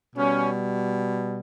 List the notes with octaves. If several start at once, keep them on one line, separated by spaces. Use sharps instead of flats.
B2 G3 C#4